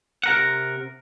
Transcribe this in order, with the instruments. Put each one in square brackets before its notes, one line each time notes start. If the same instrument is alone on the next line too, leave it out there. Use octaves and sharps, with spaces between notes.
[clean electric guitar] C3 A#4 F#5